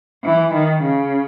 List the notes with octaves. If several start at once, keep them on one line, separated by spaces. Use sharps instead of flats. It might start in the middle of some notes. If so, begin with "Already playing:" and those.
E3
D#3
C#3